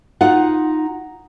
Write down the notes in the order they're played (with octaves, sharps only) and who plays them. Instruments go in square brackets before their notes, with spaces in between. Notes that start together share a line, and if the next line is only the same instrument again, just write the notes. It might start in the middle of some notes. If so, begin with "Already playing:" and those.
[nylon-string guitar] D#4 F4 F#5